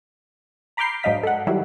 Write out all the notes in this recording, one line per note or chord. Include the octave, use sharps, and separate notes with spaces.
A#5 B5 D6 F6 G6 C7
G#2 F#3 D4 D#5 F5 B6
A4 F#5
D#3 F#3 G3 E4